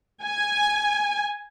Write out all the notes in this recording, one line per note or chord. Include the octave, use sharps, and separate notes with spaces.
G#5